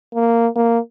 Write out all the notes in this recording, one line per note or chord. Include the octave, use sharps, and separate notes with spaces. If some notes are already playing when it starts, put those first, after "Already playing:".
A#3
A#3